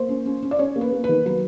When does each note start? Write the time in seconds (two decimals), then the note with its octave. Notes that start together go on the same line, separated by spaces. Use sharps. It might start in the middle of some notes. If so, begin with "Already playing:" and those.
Already playing: A#3 C5
0.09 C#4
0.26 C#4
0.43 C#4
0.51 D5
0.59 C#4 C#5
0.76 A#3
0.81 B4
0.92 A#3
1.04 B4
1.09 D#3
1.26 F#3 B4